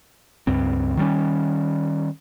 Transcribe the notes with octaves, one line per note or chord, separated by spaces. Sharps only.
C#2 G2 C4
D#3 G3 C#4